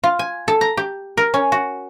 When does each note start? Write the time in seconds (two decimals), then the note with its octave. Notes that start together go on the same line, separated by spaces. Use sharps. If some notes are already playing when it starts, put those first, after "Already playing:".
0.04 F4
0.19 G#5
0.48 A4
0.61 A#5
0.77 G4
1.17 A#4
1.34 C#4
1.52 F#4